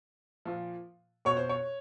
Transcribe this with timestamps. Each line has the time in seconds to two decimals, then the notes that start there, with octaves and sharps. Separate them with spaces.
0.46 A#2 F3
1.25 B2 C#5
1.37 C5
1.49 C#5